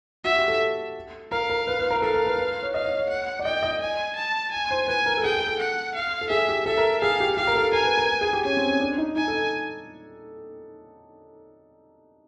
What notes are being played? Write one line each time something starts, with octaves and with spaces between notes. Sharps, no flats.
F#4 E5
G4
A4
A#4 F5
A#4
B4
B4
A#4
A4 F5
A#4
B4
B4
C#5
D#5 F5
C#5
C#5
F#5
D5
D#5 G5
D#5
G#5
A5
G#5
C5
B4 G#5
A#4
A4
G#4 G5
G#4
A4
F#5
F5
A4
G#4 E5
G4
A4 E5
A#4
G#4 F5
G4
G4 F5
A#4
A4
A#4 G#5
B4
A#4
G#4
G4
C#4 G#5
C4
C#4
D4
D#4
D#4 G#5
A4